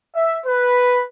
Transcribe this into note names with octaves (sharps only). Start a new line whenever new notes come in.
E5
B4